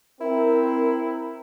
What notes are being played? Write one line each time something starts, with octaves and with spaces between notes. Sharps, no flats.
C4 E4 A#4